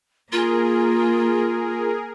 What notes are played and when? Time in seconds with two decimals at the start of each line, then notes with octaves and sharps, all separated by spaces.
0.32 A#3 F4 G#4 A#4